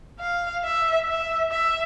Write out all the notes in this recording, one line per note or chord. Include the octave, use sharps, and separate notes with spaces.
F5
E5
E5
E5